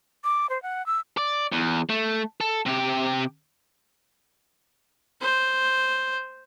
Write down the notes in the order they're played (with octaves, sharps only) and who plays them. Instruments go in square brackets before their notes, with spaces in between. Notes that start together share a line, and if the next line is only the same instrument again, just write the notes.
[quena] D6
C5
F#5
E6
[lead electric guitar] D5
E2
A3
A4
C3 G4
[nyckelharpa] C5